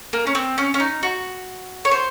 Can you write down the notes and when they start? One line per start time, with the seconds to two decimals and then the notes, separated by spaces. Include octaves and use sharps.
0.13 A#3
0.27 C#4
0.35 C4
0.58 C#4
0.74 C#4
0.80 D#4
1.03 F#4
1.85 C#5
1.91 C5